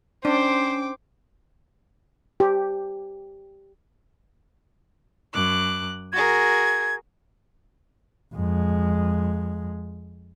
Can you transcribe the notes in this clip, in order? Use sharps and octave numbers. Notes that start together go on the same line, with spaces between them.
C#4 D4 C5 G5 D6
G4
F#2 D6 F#6
F#4 G#4 A#4 G#6
F2 G#3